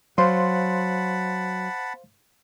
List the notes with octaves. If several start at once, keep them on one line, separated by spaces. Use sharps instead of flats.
F#3 C5 F5 F#5 A5 B5 C6